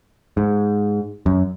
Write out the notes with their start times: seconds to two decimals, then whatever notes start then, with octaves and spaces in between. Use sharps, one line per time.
0.37 G#2
1.26 F#2